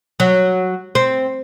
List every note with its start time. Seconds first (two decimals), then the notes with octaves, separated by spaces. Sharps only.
0.20 F#3
0.95 C4